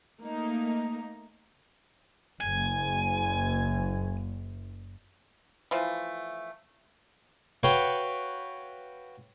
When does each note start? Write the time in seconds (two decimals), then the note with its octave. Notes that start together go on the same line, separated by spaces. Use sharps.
0.21 A3 A#3 D#4
2.41 F#1 G#5
5.71 E3 F3 A3
7.63 F#4 B4 C#5 F5 G5